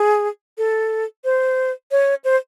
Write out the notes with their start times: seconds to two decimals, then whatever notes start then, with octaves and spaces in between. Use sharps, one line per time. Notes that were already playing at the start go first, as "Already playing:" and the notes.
Already playing: G#4
0.58 A4
1.25 C5
1.91 C#5
2.24 C5